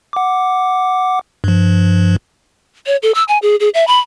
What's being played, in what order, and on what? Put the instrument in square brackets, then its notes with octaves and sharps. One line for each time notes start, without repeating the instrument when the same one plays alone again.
[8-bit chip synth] F#5 D6
G2 F3
[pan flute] C#5
A4
E6
G#5
G#4
G#4
E5
B5